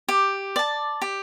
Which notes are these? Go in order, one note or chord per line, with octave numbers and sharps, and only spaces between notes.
G4
D5 A5
G4